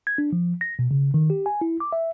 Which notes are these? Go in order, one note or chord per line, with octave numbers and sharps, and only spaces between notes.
G#6
D4
F3
A#6
B2
C#3
D#3
G4
G#5
E4
D6
E5